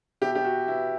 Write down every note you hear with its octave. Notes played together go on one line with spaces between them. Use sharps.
B2 E4 G4
G4
F#4
B3 E4